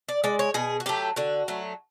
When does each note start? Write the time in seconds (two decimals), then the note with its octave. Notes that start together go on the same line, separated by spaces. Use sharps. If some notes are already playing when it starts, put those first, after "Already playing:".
0.09 D5
0.24 G#3 D5
0.39 C#5
0.54 B2 G#4
0.80 F#4
0.86 F#3 A3 G4
1.16 D3 F#4
1.48 F#3 A3